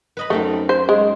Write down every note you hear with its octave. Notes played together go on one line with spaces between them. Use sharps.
B4 D#5 B5
F#2 A3 C4 D#4
C5
G#3